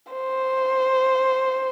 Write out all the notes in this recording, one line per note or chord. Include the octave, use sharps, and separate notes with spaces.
C5